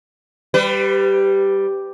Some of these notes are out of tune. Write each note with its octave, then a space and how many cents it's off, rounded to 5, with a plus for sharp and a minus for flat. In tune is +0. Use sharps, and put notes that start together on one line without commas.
G3 +0 B4 +35